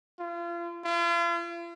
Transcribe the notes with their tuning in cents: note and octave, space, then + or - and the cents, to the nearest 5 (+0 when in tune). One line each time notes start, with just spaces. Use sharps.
F4 -35
F4 -40